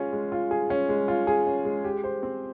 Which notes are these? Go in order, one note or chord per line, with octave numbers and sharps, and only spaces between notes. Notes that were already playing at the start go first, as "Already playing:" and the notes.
Already playing: G#3 C#4 F4 G#4
G#3
F4
G#4
C#4
G#3
F4
G#4
C#4
G#3
G4
C5
C4